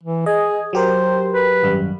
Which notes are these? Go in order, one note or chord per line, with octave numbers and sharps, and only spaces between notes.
E3
G#4 D#5
F#3 G4 A#4 C5
B4
G#1 F#2 G3